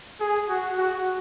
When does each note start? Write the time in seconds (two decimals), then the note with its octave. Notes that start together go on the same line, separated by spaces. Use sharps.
0.20 G#4
0.49 F#4
0.78 F#4